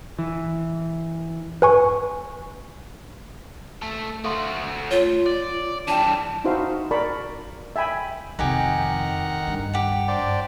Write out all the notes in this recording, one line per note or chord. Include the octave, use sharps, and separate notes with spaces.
E3
B4 G#5 C#6
A3 A4
A3 F#4 A4 F5 C6
F4 C#5
D5
E3 G3 D4 D5 G5 A5
D#4 E4 F#4 C5 E5 F5
A#4 D5 A5 B5 C#6
E5 G5 G#5 B5
F2 C3 D#3 D#4 G4 F#5 G#5 A#5
G2
G4 F#5
D4 C5 D5